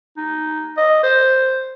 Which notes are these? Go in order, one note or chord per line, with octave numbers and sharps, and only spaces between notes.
D#4
D#5
C5